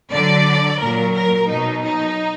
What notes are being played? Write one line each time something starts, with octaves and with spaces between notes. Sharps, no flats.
D3 F#3 D5
A#2 F#3 A#4
A#4
B2 F#3 D#4
D#4